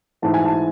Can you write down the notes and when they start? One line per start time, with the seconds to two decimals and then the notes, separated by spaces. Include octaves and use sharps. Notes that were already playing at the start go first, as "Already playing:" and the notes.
0.22 G#2 E3 A3 A5
0.34 G#5
0.45 A5